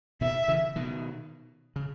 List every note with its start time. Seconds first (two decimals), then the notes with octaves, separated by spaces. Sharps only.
0.21 B2 D#3 E5
0.48 C#3 E3
0.76 B2 D#3
1.76 C#3